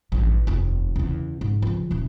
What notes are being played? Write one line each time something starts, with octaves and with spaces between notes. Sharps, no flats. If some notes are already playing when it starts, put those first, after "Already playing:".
A1 G2
F1 D#2
E2 C#3
G#2
C#3 F3
D#1 E3